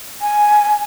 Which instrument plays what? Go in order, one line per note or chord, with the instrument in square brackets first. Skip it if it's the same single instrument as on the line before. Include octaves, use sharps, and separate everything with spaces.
[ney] G#5